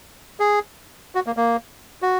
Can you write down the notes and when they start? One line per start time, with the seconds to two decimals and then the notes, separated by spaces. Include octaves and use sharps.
0.40 G#4
1.15 F#4
1.27 A#3
1.37 A#3
2.02 F#4